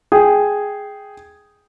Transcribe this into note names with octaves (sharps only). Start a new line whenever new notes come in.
G#4 G5